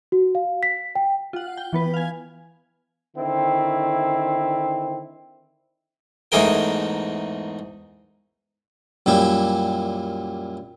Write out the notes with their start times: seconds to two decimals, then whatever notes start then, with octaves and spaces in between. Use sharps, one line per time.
0.12 F#4
0.35 F5
0.63 B6
0.95 G5
1.33 F4 F#5
1.57 G5
1.73 E3 B3 B4
1.94 F5 G#5
3.16 D3 D#3 C4 E4
6.32 E2 G#2 A3 G#4 A#4 G5
9.06 F#2 A#2 G3 E4 G5